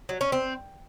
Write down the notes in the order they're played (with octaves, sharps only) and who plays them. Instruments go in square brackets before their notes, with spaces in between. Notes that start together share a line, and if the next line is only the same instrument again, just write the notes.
[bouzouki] F#3
C#4
C4